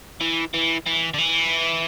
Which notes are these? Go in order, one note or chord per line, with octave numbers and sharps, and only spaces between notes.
E3
E3
E3
D3
E3